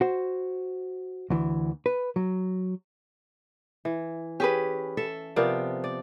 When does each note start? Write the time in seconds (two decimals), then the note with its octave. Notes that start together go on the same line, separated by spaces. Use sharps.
0.01 F#4 C5
1.30 D2 E3
1.86 B4
2.16 F#3
3.85 E3
4.40 C#4 G4 G#4 B4
4.97 A4 E5
5.36 C3 F3 B3 A#4 D5
5.84 D5